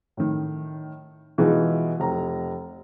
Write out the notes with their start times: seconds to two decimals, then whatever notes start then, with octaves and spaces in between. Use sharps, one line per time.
0.17 A2 D#3
1.38 B2 E3 G#3 D#4 F4
2.00 F1 A#5